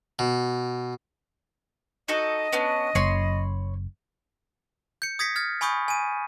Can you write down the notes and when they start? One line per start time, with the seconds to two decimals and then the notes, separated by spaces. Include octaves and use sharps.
0.19 B2
2.08 D#4 F#4 A4 D#5
2.52 B3 C#4 D4
2.95 F#1 C#5 B5 C6
5.02 G6 C#7
5.19 D#6 G#6 A#6 B6 C#7
5.36 F6 G#6 A6
5.61 G#5 B5 C#6 D#6 G6
5.88 G#5 D#7